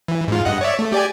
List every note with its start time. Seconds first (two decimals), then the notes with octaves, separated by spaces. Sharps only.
0.08 E3
0.28 G#2 F4
0.45 G2 D#5 F#5
0.61 C#5 D5 E5
0.79 A3
0.92 G4 D5 G#5